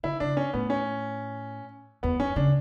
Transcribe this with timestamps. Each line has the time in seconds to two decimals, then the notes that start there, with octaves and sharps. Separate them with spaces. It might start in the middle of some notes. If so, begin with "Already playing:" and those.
0.03 D3 E4
0.20 C#3 D4
0.37 C#4
0.53 A2 B3
0.70 C#4
2.03 E2 B3
2.20 F#2 C#4
2.36 C#3 D4